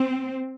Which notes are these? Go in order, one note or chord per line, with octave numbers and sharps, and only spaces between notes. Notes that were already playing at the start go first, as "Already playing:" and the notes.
Already playing: C4